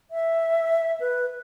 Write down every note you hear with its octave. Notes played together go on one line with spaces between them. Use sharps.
E5
B4